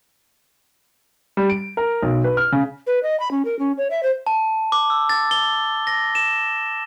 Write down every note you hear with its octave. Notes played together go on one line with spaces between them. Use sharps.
G3
D7
A#4
B1
B4
F6
C#3
B4
D#5
B5
C#4
A#4
C#4
C#5
E5
C5
A5
D6
E6
A6
G7
A#6
E7